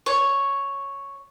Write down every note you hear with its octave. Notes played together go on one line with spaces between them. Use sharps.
C#5